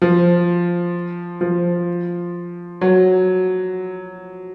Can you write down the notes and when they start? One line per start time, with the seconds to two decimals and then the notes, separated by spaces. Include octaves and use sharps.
0.02 F3
1.41 F3
2.81 F#3